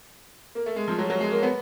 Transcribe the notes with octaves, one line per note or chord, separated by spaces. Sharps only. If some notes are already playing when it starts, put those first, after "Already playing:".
A#3
A3
G#3
F3
F#3
F#3
G#3
A#3
B3